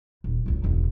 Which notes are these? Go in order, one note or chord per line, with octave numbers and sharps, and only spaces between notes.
D#1
G#1 C#2
E1 C#2